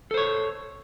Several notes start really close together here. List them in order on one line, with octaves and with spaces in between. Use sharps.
A4 C5 C#5